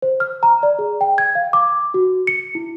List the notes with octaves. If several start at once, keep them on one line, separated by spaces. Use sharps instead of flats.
C5
F6
A#5
D5
G#4
G5
G#6
F5
D6
F#4
C#7
E4